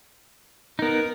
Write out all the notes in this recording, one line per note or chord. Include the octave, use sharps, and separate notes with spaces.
B3 D#4 A#4